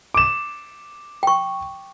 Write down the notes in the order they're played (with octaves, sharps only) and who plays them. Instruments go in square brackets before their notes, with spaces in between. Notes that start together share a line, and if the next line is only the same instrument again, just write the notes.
[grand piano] D6 E7
[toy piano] G5 C#6